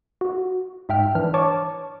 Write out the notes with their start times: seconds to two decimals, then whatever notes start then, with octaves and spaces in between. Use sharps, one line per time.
0.21 F#4
0.89 G#2 E5 G5 F6
1.15 E3 D4 F6
1.34 C#5 A5 C#6 D6